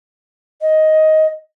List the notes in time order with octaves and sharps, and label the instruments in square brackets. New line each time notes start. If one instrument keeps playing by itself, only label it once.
[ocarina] D#5